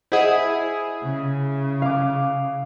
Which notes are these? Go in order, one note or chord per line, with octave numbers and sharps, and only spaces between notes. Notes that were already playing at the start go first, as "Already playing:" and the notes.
E4 G#4 C5 D#5 F#5
C#3
F5 D6